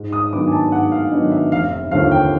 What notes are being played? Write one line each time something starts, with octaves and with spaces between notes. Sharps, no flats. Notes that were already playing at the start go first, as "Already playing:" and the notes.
Already playing: G#2
D#6
D#3 F#3 B3 D4 D6
G#5
A5
G#2 F#5
F5
D#3 F#3 B3 D4 D#5
E5
F1 F5
E5
D#2 D3 F3 F5
G5